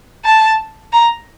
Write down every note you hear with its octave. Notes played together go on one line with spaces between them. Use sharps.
A5
A#5